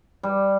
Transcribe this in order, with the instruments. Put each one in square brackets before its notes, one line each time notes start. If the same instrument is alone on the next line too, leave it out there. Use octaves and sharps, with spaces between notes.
[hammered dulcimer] G3